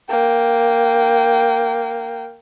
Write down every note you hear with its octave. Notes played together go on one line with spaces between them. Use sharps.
A#3 G5